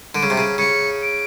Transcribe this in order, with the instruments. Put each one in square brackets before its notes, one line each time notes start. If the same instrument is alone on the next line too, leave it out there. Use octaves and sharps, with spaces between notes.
[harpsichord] D3 [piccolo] D7
[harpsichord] C#3
C3
C#3
[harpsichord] C#3 [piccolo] C#7
[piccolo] D7